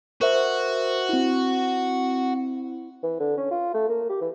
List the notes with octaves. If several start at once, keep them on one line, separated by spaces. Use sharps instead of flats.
F#4 A#4 C5 E5
C4 E4
E3
D3
C#4
F4
A3
A#3
G4
E3